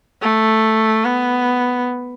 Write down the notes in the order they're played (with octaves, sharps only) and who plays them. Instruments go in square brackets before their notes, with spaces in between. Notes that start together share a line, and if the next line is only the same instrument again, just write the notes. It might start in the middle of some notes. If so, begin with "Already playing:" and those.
[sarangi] A3
B3